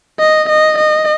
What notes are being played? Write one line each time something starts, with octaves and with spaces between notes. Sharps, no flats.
D#5
D#5
D#5